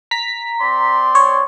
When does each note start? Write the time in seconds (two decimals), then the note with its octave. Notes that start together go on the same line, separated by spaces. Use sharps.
0.11 A#5 B6
0.60 C4 D5 C6
1.15 C#5